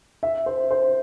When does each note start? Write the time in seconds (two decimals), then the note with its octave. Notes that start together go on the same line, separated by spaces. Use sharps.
0.23 E5
0.46 C5
0.71 C5